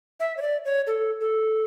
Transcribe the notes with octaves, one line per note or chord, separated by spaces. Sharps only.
E5
C#5
D5
C#5
A4
A4